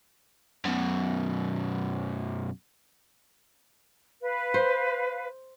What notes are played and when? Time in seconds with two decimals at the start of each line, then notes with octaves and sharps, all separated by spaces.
0.65 F#2 B2
4.22 B4 F5
4.54 C5